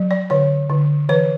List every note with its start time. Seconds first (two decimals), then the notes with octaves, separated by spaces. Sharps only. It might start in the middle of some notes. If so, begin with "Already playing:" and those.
Already playing: F#3
0.11 D5
0.30 D3 C#5
0.70 D3
1.09 E3 B4